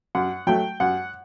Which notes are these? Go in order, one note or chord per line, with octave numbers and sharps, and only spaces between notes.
F#2 F#5
F#3 A3 G5
F#2 F#5